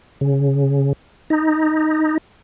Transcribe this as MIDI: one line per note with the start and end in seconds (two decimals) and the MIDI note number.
0.21 0.93 49
1.30 2.18 63